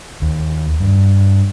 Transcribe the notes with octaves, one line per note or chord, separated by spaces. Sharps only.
D#2
G2